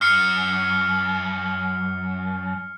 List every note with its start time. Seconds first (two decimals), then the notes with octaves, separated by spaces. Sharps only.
0.01 F#2 F6 C7 C#7